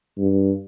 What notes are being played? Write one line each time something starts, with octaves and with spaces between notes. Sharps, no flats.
G2